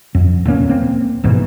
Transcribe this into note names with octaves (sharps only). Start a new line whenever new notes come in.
F2
D#1 G2 A#3 C#4
A#3 C4
C2 G#2 B2 E3